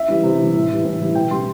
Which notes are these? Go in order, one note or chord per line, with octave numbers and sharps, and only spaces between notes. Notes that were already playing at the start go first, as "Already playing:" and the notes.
Already playing: E5
E3 G3
C3
E3 G3
A2
E3 G3
A2
E3 G3
B2 G5
G3 C6